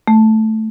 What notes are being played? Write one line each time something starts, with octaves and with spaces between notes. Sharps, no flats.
A3